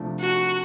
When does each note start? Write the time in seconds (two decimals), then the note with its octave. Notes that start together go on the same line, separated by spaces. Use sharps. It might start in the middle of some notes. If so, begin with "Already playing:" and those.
Already playing: C2 C3 F3 A3 D4
0.20 F#4